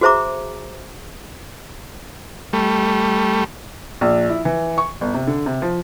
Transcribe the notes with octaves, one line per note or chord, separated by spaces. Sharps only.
F#4 G#4 C5 E5 A#5 D6
G3 A3
A#1
E4
E3
C#6
G1
C3
D3
C3
F3